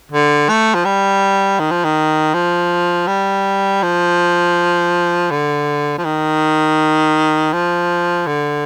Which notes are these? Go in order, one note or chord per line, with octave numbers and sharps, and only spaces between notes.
D3
A3
F3
G3
D#3
F3
D#3
F3
G3
F3
D3
F3
D#3
F3
D3